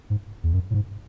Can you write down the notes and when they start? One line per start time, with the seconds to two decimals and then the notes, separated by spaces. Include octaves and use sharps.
0.10 G#2
0.43 E2
0.53 F#2
0.70 A2
0.74 G#2